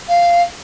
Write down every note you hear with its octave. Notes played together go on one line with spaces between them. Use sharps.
F5